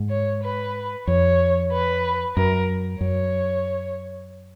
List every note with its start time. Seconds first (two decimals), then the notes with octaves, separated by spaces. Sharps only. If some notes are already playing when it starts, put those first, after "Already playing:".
Already playing: G#2
0.10 C#5
0.43 B4
1.07 F2 C#5
1.72 B4
2.36 F#2 A#4
3.00 F#2 C#5